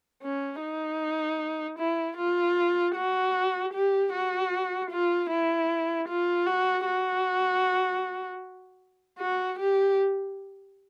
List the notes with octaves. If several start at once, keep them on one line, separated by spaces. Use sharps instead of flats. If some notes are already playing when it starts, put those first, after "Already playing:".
C#4
D#4
E4
F4
F#4
G4
F#4
F4
E4
F4
F#4
F#4
F#4
G4